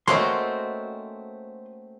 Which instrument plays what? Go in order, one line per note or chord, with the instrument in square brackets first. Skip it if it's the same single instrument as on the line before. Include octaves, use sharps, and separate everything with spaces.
[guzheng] A3 C4 C5 [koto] A#3 C#4 F#4 [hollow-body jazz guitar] D#5 C6